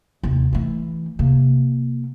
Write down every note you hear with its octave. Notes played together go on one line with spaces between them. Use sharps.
D#2 C3
E3 A3
C3 A#3